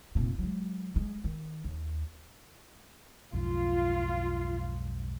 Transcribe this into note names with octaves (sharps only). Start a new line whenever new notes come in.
F1 A#2
F#3 G#3
F#3 G#3
D#3
D#2
B1 F2 G#2 F4